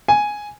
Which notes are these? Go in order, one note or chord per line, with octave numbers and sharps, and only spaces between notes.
G#5